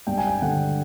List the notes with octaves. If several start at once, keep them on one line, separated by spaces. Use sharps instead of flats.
G2 G5
G#5
G5
D3 F#5